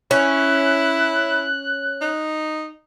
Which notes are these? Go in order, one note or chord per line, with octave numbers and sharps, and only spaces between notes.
C#4 E4 F#6
D#4